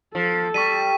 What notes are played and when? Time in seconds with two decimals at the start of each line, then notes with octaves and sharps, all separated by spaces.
0.15 F3 A4
0.54 G3 C#6 B6 D#7